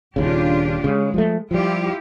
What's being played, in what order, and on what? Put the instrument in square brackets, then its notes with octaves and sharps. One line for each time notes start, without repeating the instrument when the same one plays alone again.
[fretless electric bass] D#1 D#2 C#3 [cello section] D4 F4 G4
[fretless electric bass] C#3 [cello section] G#3
[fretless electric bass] F3 G3 A3
[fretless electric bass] F3 G3 [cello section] E4 F4 G4